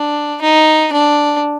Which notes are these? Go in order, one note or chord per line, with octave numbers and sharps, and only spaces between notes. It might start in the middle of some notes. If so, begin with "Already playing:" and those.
Already playing: D4
D#4
D4